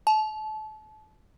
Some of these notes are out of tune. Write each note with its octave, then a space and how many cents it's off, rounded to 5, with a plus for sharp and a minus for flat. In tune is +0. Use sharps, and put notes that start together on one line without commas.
A5 -30